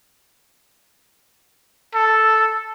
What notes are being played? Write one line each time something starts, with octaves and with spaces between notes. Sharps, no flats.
A4